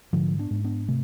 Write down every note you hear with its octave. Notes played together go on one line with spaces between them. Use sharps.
G#2 D3 F3
B3 D4
G#2
B3 D4
C3 A3